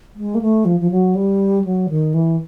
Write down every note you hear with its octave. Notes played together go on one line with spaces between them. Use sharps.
G#3
A#3
A3
F3
F3
F#3
G3
F#3
D#3
E3